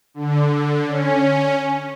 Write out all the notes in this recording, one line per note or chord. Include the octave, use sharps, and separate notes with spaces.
D3
C#4